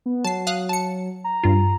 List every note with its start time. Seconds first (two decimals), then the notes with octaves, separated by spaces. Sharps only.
0.06 B3
0.24 F#3 A5 C7
0.47 F5 D#6 F#6
0.69 A5 C#7
1.24 A#5
1.43 G2 F4